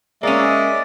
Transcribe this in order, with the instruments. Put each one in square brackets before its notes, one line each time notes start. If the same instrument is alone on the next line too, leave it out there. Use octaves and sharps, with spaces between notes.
[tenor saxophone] G#3 [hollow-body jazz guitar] A#3 C#4 [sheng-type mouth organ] D5 [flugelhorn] E5